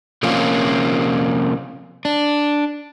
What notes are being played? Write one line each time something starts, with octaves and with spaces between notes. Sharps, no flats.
C3 F3 A#3 C#4 F4
D4